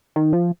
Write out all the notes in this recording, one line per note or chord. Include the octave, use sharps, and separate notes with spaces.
D#3
F3